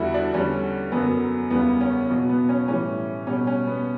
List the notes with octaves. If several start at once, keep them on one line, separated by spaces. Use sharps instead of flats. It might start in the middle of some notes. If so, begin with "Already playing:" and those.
Already playing: E2 D3 G3 E4 F#4
D4
E2 D3 G3 C#4
F#2 D3 F#3 B3
E2 C#3 G3 B3
C#4
B2 F#3
B3
C#4
A2 E3 G3 C#4
B2 G3 C#4
C#4
B3